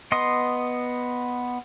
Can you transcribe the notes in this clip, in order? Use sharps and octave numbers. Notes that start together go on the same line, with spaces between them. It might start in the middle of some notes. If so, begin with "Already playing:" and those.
B3 D#5 C6 D#6